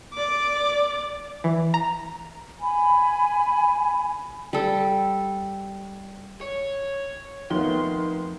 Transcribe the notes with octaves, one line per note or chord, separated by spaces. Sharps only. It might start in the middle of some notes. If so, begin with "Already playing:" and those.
D5 D6
E3
A#5
G#5 B5
G3 A4
C#5
F2 D#3 A3 B3 C6